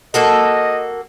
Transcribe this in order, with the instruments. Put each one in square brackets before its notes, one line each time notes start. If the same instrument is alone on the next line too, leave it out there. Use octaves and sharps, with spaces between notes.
[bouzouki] A#3 F#4 A4 [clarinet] D#5